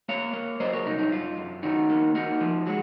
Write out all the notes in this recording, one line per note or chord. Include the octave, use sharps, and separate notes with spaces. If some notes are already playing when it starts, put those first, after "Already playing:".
A#3 C#5 F5
A#3
F#3 C5 D#5
A#4 C#5
C2 D#4
D#4
F#2 F4
F#2
D#3 D#4 F#4
A#3
A#3 D#4 F#4
F3
G#3 F#4